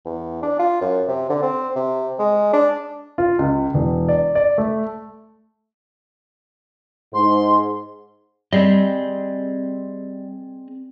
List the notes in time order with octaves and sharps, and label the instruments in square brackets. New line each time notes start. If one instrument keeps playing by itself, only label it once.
[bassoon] E2
D4
F4
F#2
C3
D3
C4
C3
G#3
D4
[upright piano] F4
C#2
E1
D5
D5
A3
[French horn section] G#2 [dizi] C6
[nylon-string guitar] G3 [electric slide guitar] C4 G#4 D#5